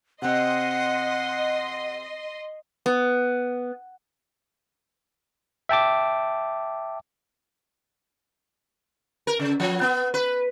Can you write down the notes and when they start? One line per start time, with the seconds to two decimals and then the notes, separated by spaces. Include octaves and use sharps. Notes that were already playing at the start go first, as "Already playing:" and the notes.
0.22 C3 C4 D#5 F#5 C6
2.86 B3
5.69 E5 G5 A5 D6
9.27 A#4
9.39 C#3
9.60 F3
9.81 B3
10.14 B4